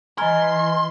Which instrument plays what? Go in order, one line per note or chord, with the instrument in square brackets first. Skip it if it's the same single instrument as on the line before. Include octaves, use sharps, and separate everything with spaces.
[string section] E3 [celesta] D#5 G#5 [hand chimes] A#5 F6 G#6 [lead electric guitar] C6